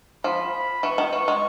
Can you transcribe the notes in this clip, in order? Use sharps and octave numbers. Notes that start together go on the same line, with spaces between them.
F3 B5
B5
E3 C#6
D#3
E3 C#6
G#3